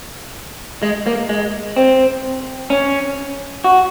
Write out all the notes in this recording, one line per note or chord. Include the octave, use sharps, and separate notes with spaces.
G#3
A#3
G#3
C4
C#4
F#4